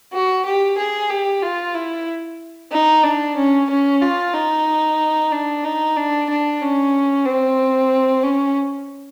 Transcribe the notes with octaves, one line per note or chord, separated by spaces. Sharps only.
F#4
G4
G#4
G4
F4
E4
D#4
D4
C#4
C#4
F4
D#4
D4
D#4
D4
D4
C#4
C4
C#4